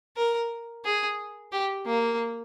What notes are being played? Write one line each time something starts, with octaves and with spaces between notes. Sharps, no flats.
A#4
G#4
G4
A#3